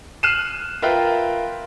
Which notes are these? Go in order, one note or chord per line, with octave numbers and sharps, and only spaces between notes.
F6 F#6 C7 D#7 E7
F4 A#4 B4 E5 G5